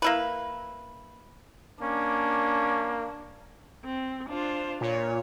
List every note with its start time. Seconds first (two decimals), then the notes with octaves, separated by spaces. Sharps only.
0.02 A#3 E4 B4
1.82 A#3 C#4 D4
3.85 C4
4.29 D4 F4 C5
4.81 A#2 C#5